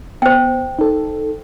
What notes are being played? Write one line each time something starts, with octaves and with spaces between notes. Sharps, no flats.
B3 C5 G5
D#4 A4